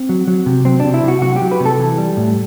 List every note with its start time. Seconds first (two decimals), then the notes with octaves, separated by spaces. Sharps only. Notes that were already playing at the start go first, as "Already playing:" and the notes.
Already playing: C4
0.09 F#3
0.28 F#3
0.46 C3
0.65 F#3 C4
0.80 D4
0.85 C3
0.94 E4
1.03 C3 F#4
1.22 F#3 F#4
1.36 G4
1.42 F#3
1.51 B4
1.60 C3
1.66 A4
1.80 E3
1.98 G3
2.17 A2